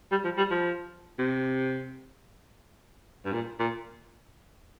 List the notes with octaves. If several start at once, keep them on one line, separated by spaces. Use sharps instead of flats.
G3
F3
G3
F3
C3
G2
A#2
A#2